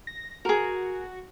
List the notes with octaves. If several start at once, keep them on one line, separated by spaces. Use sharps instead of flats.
A#6
F#4 G#4 A#4